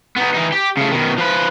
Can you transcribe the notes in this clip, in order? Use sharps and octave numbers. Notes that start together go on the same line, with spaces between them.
B3 D#4
E3 D#4
G4
C#3 A3
B2 D#3
F3 B4